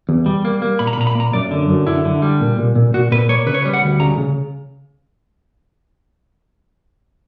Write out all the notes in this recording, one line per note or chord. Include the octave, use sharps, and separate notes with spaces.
E2
G3
A#3
A#3
A#2 B5
A#5
B5
A#2 A#5
B5
A#3 A#5
F#2 D5
D3
F#2
D3 E4
D3
G3
A#2
A#2
A#2
A#2 F#4
A#2 B4
A#3 C#5
C#3 B4
C#5
B4
G3
F#5
D2
C#3 A#5
C#3